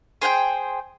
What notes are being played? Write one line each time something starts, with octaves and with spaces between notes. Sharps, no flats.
G#4 C5 F#5 G5